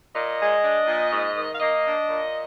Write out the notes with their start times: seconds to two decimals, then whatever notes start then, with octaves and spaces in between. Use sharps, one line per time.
0.15 A#2 D#5
0.39 G#3
0.63 D4
0.87 A#2
1.12 G#2
1.36 D#3
1.53 F5
1.60 A#3 D#5
1.85 D4
2.08 A#2